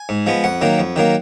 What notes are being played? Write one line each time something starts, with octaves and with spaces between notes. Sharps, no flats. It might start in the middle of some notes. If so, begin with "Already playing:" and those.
Already playing: G#5
G#2
F3 G#3 B3
F2 F#5
D#3 F#3 A#3
F2
D#3 F#3 A#3